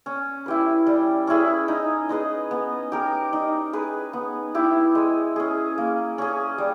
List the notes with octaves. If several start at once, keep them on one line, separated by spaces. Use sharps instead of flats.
C#4
E4 G4 B4
G3
C#4 E4 G#4
D#4
G#4 B4 D#5
B3
G4 A#4
D#4
G#4 B4
B3
E4 G4
G#3
C#4 G#4
A#3
C#4 G#4
G3